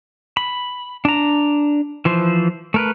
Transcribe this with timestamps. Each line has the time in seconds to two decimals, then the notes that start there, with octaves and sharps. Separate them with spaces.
0.37 B5
1.05 D4 A#5
2.05 E3 F3 C5
2.74 A3 A#4 B4